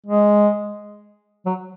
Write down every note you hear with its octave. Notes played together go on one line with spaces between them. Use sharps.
G#3
F#3